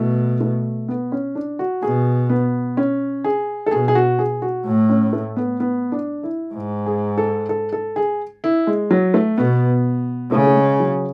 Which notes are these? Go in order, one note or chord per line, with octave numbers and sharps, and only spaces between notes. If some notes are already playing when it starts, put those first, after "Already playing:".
Already playing: B2 A3
A3
B3
C#4
D4
F#4
B2 G#4
B3
C#4
G#4
A4
B2 G#4
G#4
F#4
G#4
F#4
A2
C#4
A3
B3
B3
D4
E4
G#2
G#4
A4
A4
A4
G#4
E4
G#3
F#3
A3
B2 B3
C#3 A3
A3
G#3
F#3